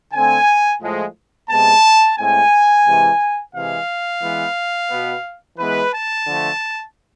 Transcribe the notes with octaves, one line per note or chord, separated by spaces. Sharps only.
D3 A3 C4 G#5
A2 F3 G#3
C3 G#3 B3 A5
A2 G#3 C4 G#5
C3 E3 G#3
C3 E3 G#3 F5
E3 G#3 B3
B2 B3
E3 G#3 B3 B4
A5
D3 F3 A3